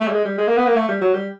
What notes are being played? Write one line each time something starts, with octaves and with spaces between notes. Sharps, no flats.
A3
G3
G#3
G3
G#3
A#3
B3
A#3
A3
G3
F#3
G3